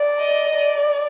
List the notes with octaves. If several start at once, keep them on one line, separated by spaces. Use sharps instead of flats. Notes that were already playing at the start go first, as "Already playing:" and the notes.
Already playing: D5
D#5
D5